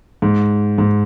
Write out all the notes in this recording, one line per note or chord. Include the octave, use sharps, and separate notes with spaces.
G#2
G#2